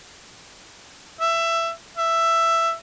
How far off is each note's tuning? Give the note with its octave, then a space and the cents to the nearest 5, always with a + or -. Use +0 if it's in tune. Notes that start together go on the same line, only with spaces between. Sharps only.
E5 +15
E5 +10